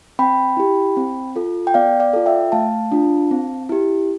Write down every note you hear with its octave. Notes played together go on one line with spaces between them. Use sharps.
C4 G5 B5
E4 G4
C4
F4 A4
G5
B3 D5 F5
D5 F5
F4 A4
E5 G5
A3 F5 A5
D4 F4
C4
E4 G4